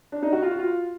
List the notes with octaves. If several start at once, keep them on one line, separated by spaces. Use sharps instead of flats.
D4
D#4
F#4
F4
F#4
F4